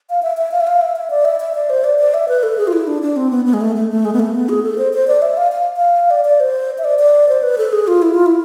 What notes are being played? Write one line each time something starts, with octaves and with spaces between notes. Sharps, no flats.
F5
E5
E5
F5
E5
F5
E5
E5
D5
E5
E5
D5
C5
D5
D5
E5
B4
A4
G#4
F4
E4
D4
D4
C4
B3
B3
G#3
A3
A3
A3
G#3
B3
A3
B3
G#4
A4
C5
C5
D5
E5
F5
F5
F5
D5
D5
C5
E5
D5
D5
C5
B4
A4
G#4
F4
E4
F4
E4